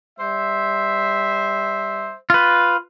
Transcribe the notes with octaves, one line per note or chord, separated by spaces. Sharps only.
G3 C5 E5
F4 B4